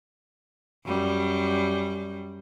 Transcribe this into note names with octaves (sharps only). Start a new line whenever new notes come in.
F#2 G3